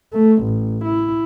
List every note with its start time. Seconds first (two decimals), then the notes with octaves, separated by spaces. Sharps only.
0.13 A3
0.44 A1
0.85 E4